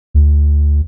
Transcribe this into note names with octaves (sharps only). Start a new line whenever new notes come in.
D2